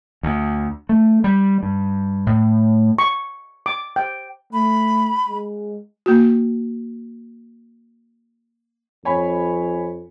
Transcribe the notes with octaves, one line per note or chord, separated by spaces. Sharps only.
D2
A3
G3
G2
A2
C#6
D6
G5
A3 B5
G#3
A#3 F#4
F2 C#5 G#5 B5